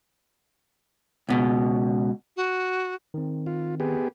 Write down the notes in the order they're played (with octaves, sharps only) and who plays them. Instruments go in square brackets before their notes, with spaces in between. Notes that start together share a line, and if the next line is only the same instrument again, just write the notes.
[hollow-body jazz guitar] C#2 B2
[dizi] F#4
[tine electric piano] D#3 C4
[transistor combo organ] F4
B3 G4 G#4